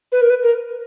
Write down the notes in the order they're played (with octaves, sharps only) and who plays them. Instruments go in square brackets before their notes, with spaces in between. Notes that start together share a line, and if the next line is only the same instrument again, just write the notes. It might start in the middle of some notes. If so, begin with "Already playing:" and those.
[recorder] B4
A#4
B4
A#4